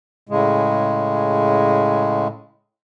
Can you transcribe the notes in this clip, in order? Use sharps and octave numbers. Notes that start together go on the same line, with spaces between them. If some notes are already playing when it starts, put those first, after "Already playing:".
A2 C#3 G#3